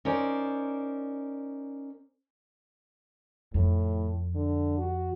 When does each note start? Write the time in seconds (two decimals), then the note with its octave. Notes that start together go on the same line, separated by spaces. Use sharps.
0.05 C#4 D#4 A#4 C5 D5
3.54 F2 A2
4.35 D3
4.79 F#4